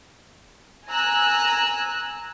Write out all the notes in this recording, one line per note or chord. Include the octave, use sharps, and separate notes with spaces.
G#5 A#5 E6 F#6